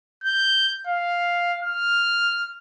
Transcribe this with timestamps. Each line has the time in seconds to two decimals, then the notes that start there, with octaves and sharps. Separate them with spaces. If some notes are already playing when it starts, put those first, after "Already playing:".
0.24 G6
0.87 F5
1.63 F6